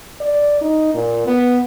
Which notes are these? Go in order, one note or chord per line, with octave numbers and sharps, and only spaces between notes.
D5
D#4
A#2
B3